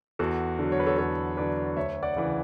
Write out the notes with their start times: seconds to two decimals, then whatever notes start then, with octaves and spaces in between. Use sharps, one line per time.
0.19 E2 F#4 A4
0.59 D3 F#3
0.72 C#5
0.80 B4
0.86 A4 C#5
0.98 E2 A4 C#5
1.37 D3 F#3 B4 D5
1.77 D2 C#5 E5
2.03 D5 F#5
2.16 C#3 E3